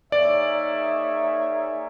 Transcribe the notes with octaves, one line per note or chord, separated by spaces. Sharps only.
A#3 D#4 G#4 C#5 D5 E5